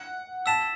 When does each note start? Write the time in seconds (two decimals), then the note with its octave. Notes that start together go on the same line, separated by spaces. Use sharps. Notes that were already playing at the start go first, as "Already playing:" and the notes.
Already playing: F#5
0.46 A5 E6 B6 E7